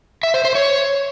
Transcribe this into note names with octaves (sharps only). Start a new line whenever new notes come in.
E5
C5
C5
C#5